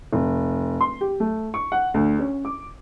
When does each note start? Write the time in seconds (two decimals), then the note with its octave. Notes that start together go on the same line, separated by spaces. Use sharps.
0.13 F1
0.81 C6
1.01 G4
1.20 A3
1.54 C#6
1.72 F#5
1.94 D2
2.19 C#4
2.45 D6